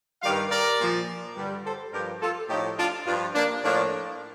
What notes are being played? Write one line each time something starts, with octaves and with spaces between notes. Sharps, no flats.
G2 D#3 G3 D5 F5
A#4 D5
A#2 F3
G2 D3 G3
A4 C5
G2 F3 G4 A#4
F4 A4
A2 F3 D#4 G4
D4 F4
G2 F3 D4 F4
A#3 D4
A2 F3 A#3 D4